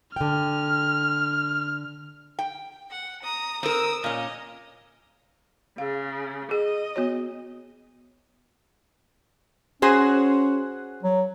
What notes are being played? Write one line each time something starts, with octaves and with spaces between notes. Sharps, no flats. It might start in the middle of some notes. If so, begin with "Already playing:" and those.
D3 G5 F6
G5
F#5
A#5 D#6
C4 A#4 D#6 E6
A#2 C#4 D#5
C#3 G#4 F5
G#4 D#5
B3 F#4 C#5
C#4 F#4 G#4 C5
F#3